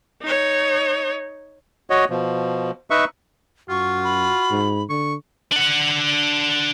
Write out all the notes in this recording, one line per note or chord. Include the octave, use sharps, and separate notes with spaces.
D#4 C#5
F#4 C#5 D#5
B2 F3
D#4 B4 E5 C#6
F#2 F4 F#4 C#6
B5
G#2
D3 C#6
D4 F#5